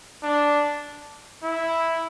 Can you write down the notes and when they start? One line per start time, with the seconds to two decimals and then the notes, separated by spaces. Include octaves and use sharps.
0.23 D4
1.43 E4